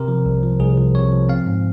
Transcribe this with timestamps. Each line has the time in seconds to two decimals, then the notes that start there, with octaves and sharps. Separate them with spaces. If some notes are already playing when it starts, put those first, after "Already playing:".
Already playing: C3 A#4
0.08 F3
0.26 C2
0.43 F3
0.60 C2 G#4
0.77 F3
0.95 C3 C#5
1.12 F3
1.29 C4 F5
1.46 G#2